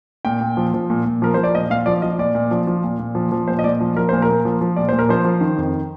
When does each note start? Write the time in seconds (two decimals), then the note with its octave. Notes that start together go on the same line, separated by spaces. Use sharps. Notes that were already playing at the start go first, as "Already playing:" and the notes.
0.25 A#2 G5
0.41 A#2
0.57 F3
0.74 F3
0.90 A#2
1.05 A#2
1.22 F3 A#4
1.34 F3 C5
1.44 D5
1.54 A#2 D#5
1.70 A#2 F5
1.86 F3 D5
2.02 F3 D#5
2.18 A#2 D5
2.35 A#2
2.51 F3
2.67 F3
2.84 A#2
2.99 A#2
3.15 F3
3.32 F3
3.48 A#2 C5
3.59 D#5
3.64 A#2 D5
3.81 F3
3.96 F3 A#4
4.09 A#2 C5
4.22 A#4
4.28 A#2
4.45 F3
4.61 F3
4.76 A#2 D5
4.89 A#2 C5
4.99 A#4
5.09 F3 C5
5.25 F3
5.41 D#3
5.58 F2